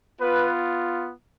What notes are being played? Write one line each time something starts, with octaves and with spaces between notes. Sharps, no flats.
B3 F4 B4